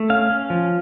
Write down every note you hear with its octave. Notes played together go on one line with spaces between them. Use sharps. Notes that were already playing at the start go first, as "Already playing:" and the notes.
Already playing: A3
C#4 F5
C#4
F3